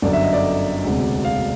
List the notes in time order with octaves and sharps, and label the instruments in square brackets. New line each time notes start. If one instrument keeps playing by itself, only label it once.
[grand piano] G1 F#2 D3 D5
E5
D#5
D5
E1 D2 C3
F5